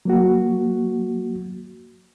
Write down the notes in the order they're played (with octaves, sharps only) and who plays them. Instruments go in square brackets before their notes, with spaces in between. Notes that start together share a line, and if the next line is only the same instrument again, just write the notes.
[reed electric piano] F#3 A#3 F#4